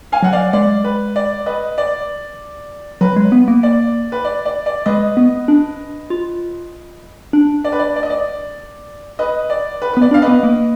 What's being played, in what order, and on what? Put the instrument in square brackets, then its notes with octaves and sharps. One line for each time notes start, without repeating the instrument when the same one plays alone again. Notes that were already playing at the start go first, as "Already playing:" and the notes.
[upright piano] F5 G#5
[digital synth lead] F#3 [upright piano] F#5
[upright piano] D5 F5
[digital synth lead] G#3 [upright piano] D5
[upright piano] B4
D5
B4 D#5
D5
[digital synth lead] F#3 [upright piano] B4
[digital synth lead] G#3
B3
A#3
[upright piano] D5
B4
D5
D5
D5
[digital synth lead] G#3 [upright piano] B4 D#5
[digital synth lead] B3
D4
F4
D4
[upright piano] D5
B4
D5
D5
D#5
D5
B4 D#5
D5
B4
[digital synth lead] B3 [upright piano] B4
[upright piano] D5
[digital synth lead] D4
[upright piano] F5
B4 D#5
[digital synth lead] B3
A#3